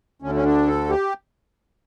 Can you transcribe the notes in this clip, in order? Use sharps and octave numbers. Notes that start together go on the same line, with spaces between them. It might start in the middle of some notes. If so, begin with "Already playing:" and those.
D2 D3 C#4
C#4
D4
A4
G4